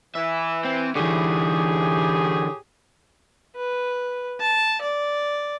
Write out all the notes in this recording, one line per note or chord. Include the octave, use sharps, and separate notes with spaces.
E3 E5
C4
A2 D3 E3 G4 G#4
B4
A5
D5